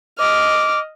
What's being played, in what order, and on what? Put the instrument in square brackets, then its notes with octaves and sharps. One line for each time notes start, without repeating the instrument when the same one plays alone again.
[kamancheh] D#5 F6 [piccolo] D6